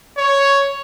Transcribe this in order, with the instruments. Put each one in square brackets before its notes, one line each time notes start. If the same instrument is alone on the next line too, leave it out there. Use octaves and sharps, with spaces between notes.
[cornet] C#5